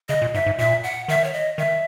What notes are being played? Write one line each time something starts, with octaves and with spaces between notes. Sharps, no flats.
C#3 D#5
A#2
G#2 E5
G#2
A#2 E5
F#5
D#3 E5
C#5
D#5
D#3 E5